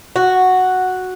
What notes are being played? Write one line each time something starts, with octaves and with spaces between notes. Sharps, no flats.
F#4